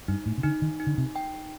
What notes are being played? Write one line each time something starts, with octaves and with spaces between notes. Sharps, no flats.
G2 D#4
A2
C3
D3 D#4
D#3
D#4
D3
C3
G5